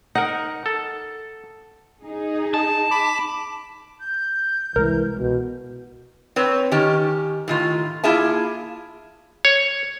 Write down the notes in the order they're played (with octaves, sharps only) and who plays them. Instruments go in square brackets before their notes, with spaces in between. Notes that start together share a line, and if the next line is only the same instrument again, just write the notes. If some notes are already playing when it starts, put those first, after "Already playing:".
[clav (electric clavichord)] D#4 A#4 [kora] F#5
[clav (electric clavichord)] A4
[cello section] D#4 G#4
[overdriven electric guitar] A5
[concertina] B5 D6
[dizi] G6
[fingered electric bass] C2 G#3 [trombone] E3 [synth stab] A#4
[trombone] B2
[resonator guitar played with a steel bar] C4 B4 C#5
D#3 C#4 G4
A2 D#3 F4
A#3 E4 F4 G#4 E5 A5
[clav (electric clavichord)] C#5